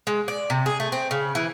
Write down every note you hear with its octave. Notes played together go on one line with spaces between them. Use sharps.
G#3
D5
C3
G#4
A3
C4
C#3
E3